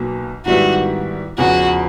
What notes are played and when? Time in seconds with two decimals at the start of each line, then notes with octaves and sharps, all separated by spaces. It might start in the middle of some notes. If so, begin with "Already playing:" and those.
Already playing: B1 B2 F#3 A#3
0.45 G#2 D#3 G3 B3 E4 F#4
1.38 E2 C#3 F3 F#4